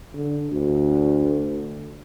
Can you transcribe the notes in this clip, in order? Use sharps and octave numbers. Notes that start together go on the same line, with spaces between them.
D3
D2